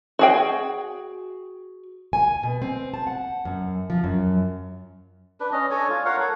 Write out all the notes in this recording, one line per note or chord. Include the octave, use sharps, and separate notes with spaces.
F#4 G#4 G5
G#5
B2
C4
A5
F#5
F#2
F3
F#2
D4 B4
C#4 D#5
D4 A4 C#5 G#5
F4
A#4 C#5 F5 F#5
A4 F#5